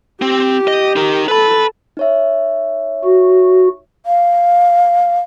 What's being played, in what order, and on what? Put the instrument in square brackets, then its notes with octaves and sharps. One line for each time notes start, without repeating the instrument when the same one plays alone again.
[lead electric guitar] C4 [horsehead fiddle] G4
[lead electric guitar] D#5
D#4 A#4
[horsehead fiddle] A4 [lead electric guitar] B4 B5
[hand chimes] D#4 C#5 E5
[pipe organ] F#4
[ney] F5